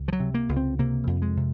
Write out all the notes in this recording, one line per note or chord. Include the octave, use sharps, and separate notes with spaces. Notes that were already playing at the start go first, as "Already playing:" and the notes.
Already playing: C#2
F3
F#3
C3
A#3
C#2
C4
C3 A#3
F2
G#3
C3